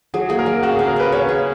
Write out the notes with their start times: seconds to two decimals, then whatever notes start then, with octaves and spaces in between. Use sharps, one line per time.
0.14 F#3 G#4
0.29 A#3 G#4
0.39 A#4
0.46 F#3
0.63 C#3 F#4
0.75 C#3 G#4
0.88 A#4
0.96 C#3 B4
1.12 C#4 C#5
1.29 G#4